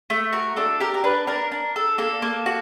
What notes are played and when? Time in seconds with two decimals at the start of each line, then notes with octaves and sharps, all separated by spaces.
0.10 A3
0.33 F#4 A#4
0.56 D4 A4
0.80 G4 A#4
0.94 A#4
1.04 D4 B4
1.27 D4 A#4
1.52 D4
1.76 A4
1.98 A#3 A4
2.22 A#3
2.46 F#4